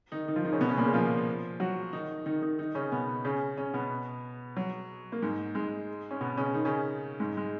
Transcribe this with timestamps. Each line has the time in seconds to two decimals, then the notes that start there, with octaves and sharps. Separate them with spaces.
0.12 D#3 D#4
0.28 D#3 D#4
0.36 F3 F4
0.45 D#3 D#4
0.52 C#3 C#4
0.61 B2 B3
0.69 C#3 C#4
0.77 A#2 A#3
0.86 C#3 C#4
0.94 F3 F4
1.60 F#3 F#4
1.93 D#3 D#4
2.26 D#3 D#4
2.42 D#3 D#4
2.59 D#3 D#4
2.75 C#3 C#4
2.92 B2 B3
3.25 C#3 C#4
3.58 C#3 C#4
3.74 B2 B3
4.56 F#3
5.12 A#3
5.22 G#2 G#3
5.55 G#2 G#3
6.11 C#4
6.21 B2 B3
6.37 C#3 C#4
6.54 D#3 D#4
6.65 C#3 C#4
7.20 G#2 G#3
7.37 G#3